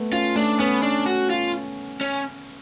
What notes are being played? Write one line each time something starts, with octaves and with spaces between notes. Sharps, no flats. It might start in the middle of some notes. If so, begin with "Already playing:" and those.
Already playing: A3 B3
C#4 F4
A3 D4
B3 C#4
D4
F#4
F4
C#4